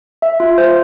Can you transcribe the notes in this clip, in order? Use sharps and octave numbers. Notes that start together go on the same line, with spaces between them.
E5
F4
C5